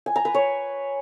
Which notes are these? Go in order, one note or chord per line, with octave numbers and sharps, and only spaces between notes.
G#5
A#5
B4
C#5